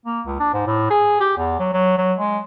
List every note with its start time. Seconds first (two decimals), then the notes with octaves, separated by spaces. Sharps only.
0.06 A#3
0.26 C#2
0.39 D4
0.53 G#2
0.66 A2
0.90 G#4
1.20 G4
1.37 E2
1.59 F#3
1.73 F#3
1.98 F#3
2.18 G#3